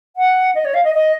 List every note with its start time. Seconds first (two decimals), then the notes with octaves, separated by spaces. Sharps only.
0.16 F#5
0.55 D#5
0.65 C#5
0.74 F5
0.84 D#5
0.94 D#5